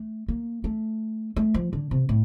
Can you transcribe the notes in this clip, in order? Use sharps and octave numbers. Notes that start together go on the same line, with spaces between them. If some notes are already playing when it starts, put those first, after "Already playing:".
Already playing: A3
A#3
A3
A3
F3
D3
C3
A2